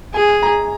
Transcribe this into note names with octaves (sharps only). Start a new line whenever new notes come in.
G#4 G#5
A#5